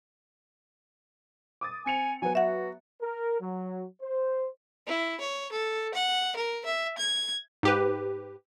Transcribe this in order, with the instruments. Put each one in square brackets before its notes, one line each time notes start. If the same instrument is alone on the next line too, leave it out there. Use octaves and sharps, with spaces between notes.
[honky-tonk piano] D6 D#6 A6
[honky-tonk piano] C4 C#7 F7 [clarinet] G#5
[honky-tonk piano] F#3 B3 [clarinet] G#5
[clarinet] F#4 [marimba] E5 F#5
[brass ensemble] A#4
F#3
C5
[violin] E4
C#5
A4
F#5
A#4
E5
G#6
[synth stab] G#2 G4 B4